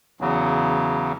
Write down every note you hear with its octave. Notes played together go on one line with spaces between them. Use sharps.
E2 C#3 F#3